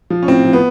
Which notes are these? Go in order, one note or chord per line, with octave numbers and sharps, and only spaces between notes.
F3
C#4
A2 C4
F3
B3